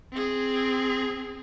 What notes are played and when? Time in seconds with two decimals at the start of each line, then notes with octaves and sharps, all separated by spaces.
0.12 C4 G#4